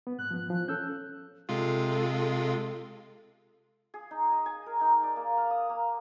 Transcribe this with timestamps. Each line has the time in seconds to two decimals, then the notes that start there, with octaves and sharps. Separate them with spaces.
0.07 B3
0.19 G#2 F#6
0.31 F3 B3
0.48 E3 F3
0.68 C#4 A4 E6 G6
1.49 C3 G#3 F4 A4
3.94 G#4
4.11 D#4
4.32 D#5
4.46 G#5
4.66 A#4
4.81 D#4
5.03 D5
5.16 A#3
5.37 F5
5.50 D#6
5.69 A#3